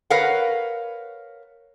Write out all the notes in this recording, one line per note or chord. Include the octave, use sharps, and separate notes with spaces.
A#4 B4 C#5 F5 F#5